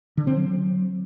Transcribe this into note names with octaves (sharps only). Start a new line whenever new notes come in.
D3
C4
F#3